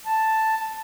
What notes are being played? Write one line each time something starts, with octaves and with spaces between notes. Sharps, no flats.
A5